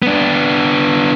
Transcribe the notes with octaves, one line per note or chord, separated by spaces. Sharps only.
B3 D4